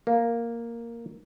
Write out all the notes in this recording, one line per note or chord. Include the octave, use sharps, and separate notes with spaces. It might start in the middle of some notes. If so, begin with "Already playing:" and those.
A#3